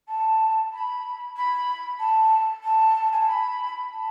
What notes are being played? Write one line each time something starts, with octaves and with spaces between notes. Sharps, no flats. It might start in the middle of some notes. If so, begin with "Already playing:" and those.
A5
B5
B5
A5
A5
G#5
A5
B5
A5